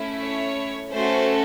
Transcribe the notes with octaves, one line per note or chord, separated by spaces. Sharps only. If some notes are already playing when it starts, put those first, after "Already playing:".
Already playing: A3 C#4 E4
C#5
A3 C#4 F#4 A4 C5